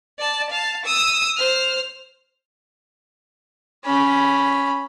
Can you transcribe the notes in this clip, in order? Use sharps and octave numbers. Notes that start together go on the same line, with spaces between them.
D5 A5
F5 A5
D#6 E6
C5 F6
C#4 B5